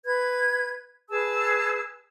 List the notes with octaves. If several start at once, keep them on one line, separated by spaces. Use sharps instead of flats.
B4 G#6
G#4 B4 A5 E6